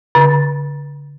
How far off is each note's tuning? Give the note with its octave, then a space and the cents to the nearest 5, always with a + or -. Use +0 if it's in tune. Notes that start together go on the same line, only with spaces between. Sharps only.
D3 -35